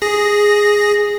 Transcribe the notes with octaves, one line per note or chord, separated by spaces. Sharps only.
G#4 A#6